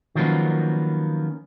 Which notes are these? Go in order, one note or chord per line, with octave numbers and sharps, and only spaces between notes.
D#3 F3 F#3 A#3 B3 C#4